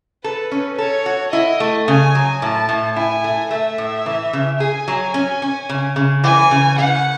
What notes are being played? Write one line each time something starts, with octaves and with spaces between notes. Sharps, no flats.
A4 B4
C#4
A4 C#5
F#4
E4 D#5
A3
C#3 G#5
F#3
A2 A5
A2
E4 G#5
A3
A3 E5
A2
E3
C#3
G#4 G#5
F#3
C#4
C#4
C#3
C#3
E3 G#5
C#3
C#3 F#5